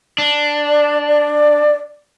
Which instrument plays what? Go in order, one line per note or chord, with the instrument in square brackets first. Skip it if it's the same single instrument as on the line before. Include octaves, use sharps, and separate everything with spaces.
[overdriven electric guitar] D4
[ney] D5
D5